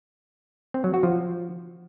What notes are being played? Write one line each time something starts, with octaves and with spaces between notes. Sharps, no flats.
C4
F#3
F#4
F3